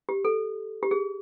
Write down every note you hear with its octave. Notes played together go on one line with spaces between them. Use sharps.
G4
A4
G4
G#4